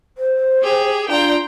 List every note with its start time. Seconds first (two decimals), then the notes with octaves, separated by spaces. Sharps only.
0.18 C5
0.61 G4 G#4
1.09 D4 F4 D5 G5 A#5 C6